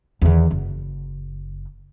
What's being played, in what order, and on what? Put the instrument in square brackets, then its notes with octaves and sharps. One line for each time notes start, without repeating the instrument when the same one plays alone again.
[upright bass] E2 D#3
F#1